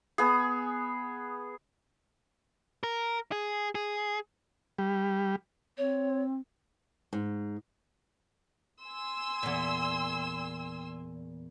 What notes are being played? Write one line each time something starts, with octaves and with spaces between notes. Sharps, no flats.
B3 G#4
A#4
G#4
G#4
G3
C4 C#5
G#2
G#5 C6 E6
E2 A#2